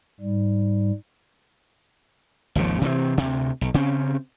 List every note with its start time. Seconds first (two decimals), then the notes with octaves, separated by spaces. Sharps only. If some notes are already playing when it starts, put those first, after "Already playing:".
0.21 G#2 G3
2.55 G#1 D#2 C#3 F3
2.81 C3 E3 F#3 C4
3.18 D2 C3
3.61 B1
3.74 C#3 C4 C#4